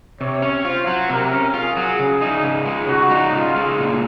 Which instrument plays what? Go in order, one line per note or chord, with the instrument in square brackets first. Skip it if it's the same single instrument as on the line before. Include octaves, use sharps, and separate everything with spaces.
[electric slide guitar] C3 [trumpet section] C#5
[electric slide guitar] C#4
[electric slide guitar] F4 [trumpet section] C5
[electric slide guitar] F#3
[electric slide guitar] C3 [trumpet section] A#4
[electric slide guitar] C#4
[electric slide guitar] F4 [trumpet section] G#4
[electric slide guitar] F#3
C#3
D#4
C#3
G#3
[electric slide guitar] C#3 [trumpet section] F#4
[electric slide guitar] D#4
[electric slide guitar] C#3 [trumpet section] F4
[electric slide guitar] G#3
A#2